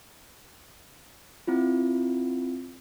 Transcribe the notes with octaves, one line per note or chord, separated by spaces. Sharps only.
C4 E4 F4